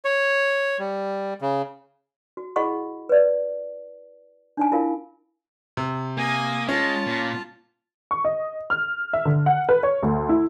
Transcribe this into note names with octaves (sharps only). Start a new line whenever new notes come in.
C#5
G3
C#3
F#4
E4 G#4 D#5 F#5 B5 C#6
B4 D5
D4 D#4 G#5
E4 F4 A#4 F5
C3
A#3 G#5 D#6
G#3 C#4 F4 A5
A#2
C#6
D#5
F6
E5
D3
F#5
B4
C#5
D2
E4